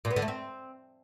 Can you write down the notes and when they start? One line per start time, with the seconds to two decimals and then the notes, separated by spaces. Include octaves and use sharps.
0.05 A#2
0.11 B3
0.16 D3
0.22 A3
0.28 C4